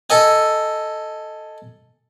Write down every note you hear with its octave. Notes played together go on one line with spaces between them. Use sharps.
A4 D#5 G#5